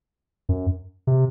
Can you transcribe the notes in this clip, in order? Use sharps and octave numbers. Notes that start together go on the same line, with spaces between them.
F#2
C3